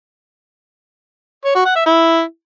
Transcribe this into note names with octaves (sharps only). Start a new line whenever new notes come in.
C#5
F#4
F#5
E5
E4